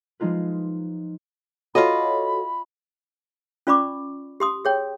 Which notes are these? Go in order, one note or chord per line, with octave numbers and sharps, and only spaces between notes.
F3 G#3 D#4 F4 B4
F4 F#4 A4 C#5 D#5 B5
C#4 F4 D5 B5 C#6 D6
G4 C6 D#6
G#4 C#5 G5